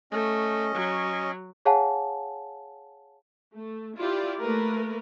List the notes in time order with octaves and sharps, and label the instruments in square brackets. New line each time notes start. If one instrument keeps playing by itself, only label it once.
[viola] A3 [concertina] C#4 D#5
[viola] F#3
[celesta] G#4 C#5 F5 F#5 G#5 A5
[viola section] A3
E4 F4 G4 D5
A3 A#3 A#4 B4